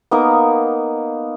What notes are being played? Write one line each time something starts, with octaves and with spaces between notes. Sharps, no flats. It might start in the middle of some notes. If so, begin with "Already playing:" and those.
A#3 B3 D#4 A#4